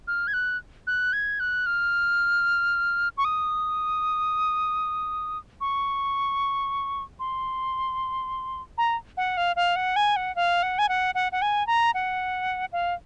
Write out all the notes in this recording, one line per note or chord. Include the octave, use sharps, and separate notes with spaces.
F6
G#6
F#6
F#6
G#6
F#6
F6
C#6
D#6
C#6
C6
A#5
F#5
F5
F5
F#5
G#5
F#5
F5
F#5
G#5
F#5
F#5
F#5
G#5
A#5
F#5
F5